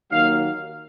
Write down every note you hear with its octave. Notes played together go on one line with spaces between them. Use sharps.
D#2 D#3 F#3 A#3 F5